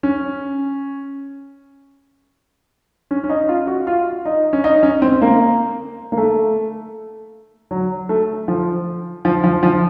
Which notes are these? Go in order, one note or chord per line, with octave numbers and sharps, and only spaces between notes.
C#4
C#4
C#4
D#4
F4
F#4
F4
D#4
C#4
D#4
C#4
C4
A#3
A#3
A3
F#3
A3
F3
F3
F3
F3